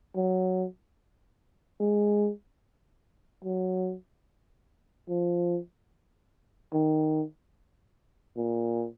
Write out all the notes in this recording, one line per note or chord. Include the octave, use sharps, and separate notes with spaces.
F#3
G#3
F#3
F3
D#3
A#2